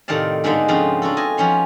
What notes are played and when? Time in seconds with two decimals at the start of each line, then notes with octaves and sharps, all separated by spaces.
0.08 A2 C3 D#3 D5 F5 A5
0.44 G#2 D3 A#3 B3 D4 D#4
0.68 C#3 F3 B3 C4 D4 F4
1.02 D4 F4 F#4 A4
1.17 D#5 G#5 A5
1.37 F3 B3 C#4 C#5 C6